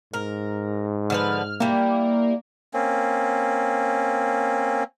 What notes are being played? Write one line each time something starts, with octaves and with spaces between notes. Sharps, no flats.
G#2 A#4
D3 F3 B4 F6
G3 A#3 E4
A#3 C4 C#4